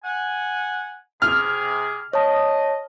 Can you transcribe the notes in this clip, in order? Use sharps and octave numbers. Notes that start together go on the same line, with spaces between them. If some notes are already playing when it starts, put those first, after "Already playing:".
F#5 G#5
C3 G#4 F6
C#5 D#5 A5